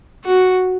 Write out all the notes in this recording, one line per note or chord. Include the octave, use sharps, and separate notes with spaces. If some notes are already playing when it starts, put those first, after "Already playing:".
F#4